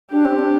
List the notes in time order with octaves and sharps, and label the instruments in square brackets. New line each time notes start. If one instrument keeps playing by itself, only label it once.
[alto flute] D4 [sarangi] G4
[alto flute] C4
D4